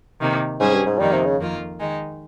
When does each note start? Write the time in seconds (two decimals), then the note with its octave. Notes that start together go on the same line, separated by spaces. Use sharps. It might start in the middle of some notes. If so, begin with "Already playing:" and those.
0.20 C3 D#3 A#3
0.60 G#2 G3 C#4 G#4 C5
0.73 G2
0.86 G#2
0.99 F2 D#3 G3 A#3 D#4
1.13 C3
1.25 C#3
1.38 F2 D#3 A#3 F4
1.79 D#3 G#3 D#4